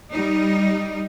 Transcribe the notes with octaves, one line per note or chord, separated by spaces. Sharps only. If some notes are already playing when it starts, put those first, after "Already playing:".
G3 D#4